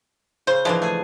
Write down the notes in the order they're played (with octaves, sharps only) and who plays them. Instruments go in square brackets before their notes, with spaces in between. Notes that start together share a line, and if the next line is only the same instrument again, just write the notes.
[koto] C#3 [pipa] C5
[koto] E3 F3 [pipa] G#3 D4
[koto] A3 G#4